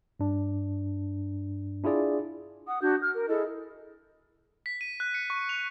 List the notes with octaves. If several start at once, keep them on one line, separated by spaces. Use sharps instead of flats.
G2 D4
D4 E4 F4 G#4 D5
F#5 D#6
D4 F#4 G6
F6
A#4
E4 G#4 A4 D#5
B6
D#7
F#6
C#7
C#6
F7